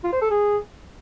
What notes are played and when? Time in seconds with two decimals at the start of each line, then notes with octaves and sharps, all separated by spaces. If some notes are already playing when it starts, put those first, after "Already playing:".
0.04 F4
0.13 C5
0.22 A4
0.31 G#4